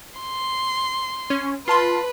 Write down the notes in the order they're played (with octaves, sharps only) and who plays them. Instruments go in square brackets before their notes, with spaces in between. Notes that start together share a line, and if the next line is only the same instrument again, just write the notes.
[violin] C6
[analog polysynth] C#4
[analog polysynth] F4 A5 C6 [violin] B4